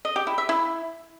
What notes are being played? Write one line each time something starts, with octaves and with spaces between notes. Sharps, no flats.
D#5
G4
E4
E5
E4